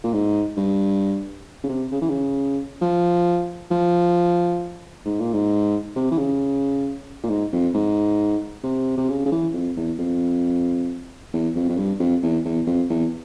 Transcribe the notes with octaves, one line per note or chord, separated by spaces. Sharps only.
A#2
G#2
G2
C#3
C3
C#3
E3
C#3
F3
F3
G#2
A#2
G#2
C3
E3
C#3
A#2
G#2
F2
G#2
C3
C3
C#3
C#3
E3
F2
E2
F2
E2
F2
F2
G2
F2
E2
E2
F2
E2